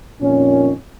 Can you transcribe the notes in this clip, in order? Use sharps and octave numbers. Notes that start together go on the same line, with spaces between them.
F2 A#2 D#3 C#4